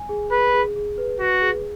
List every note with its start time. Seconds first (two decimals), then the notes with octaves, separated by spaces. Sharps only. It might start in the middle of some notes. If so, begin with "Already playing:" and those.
Already playing: G#5
0.09 G#4
0.31 G#4 B4
0.54 G#4
0.76 G#4
0.98 B4
1.19 F#4 B4
1.42 G#4